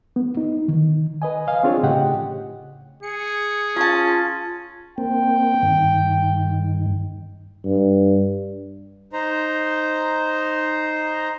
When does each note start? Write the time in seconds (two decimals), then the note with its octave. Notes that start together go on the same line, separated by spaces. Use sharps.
0.16 B3
0.37 D#4
0.68 D#3
1.22 B4 D#5 G#5
1.47 D#5 F5 G#5
1.63 C4 D4 F4 G#4 C#5
1.83 A2 C#3 G4 D#5 F#5 G5
3.03 G#4 C#7
3.76 C#4 F4 A5 A#5
4.98 A#3 C4 G5
5.62 G2 D#3
7.65 G2
9.13 D#4 C5 A#5